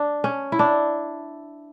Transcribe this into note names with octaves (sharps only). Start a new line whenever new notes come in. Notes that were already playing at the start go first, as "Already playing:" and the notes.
Already playing: D4
C#4
E4
D4